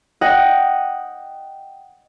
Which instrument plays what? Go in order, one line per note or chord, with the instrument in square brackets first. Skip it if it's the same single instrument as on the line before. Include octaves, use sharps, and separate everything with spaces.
[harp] D#5 F#5 G5